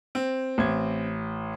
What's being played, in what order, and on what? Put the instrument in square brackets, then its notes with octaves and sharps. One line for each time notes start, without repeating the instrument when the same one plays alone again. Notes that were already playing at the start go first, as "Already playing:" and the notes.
[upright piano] C4
[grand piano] A1 G#6